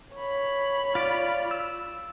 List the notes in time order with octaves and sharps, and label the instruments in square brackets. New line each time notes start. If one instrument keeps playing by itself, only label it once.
[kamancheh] C#5 B5
[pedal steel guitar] F4 D5
E6